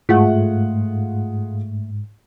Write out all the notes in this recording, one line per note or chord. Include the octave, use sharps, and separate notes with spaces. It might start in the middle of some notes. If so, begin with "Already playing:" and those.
G#2 A3 F4 G#4 F#5